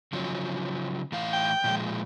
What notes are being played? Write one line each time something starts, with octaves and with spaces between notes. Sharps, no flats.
C#3 F3 F#3
A2 E3 F5
G5
A#2 F3 G#3